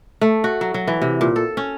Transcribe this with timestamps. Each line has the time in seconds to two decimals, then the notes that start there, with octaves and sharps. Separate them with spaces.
0.21 A3
0.44 F#4
0.61 F#3
0.74 F#3
0.87 E3
1.02 C3
1.21 A#2
1.36 A4
1.57 C#4